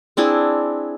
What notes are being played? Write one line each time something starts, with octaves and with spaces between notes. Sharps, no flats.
C4 D4 E4 G#4